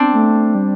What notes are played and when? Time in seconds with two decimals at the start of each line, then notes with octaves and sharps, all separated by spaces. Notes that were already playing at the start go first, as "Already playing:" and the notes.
Already playing: C4 D4
0.13 A3
0.55 G3